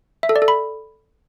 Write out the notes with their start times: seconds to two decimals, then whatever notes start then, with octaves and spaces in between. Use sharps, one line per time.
0.23 E5
0.29 A4
0.36 D5
0.42 A4
0.48 B5